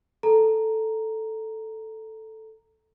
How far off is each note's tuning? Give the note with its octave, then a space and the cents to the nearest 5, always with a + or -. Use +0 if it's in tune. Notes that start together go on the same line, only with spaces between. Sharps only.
A4 +0 A#5 +0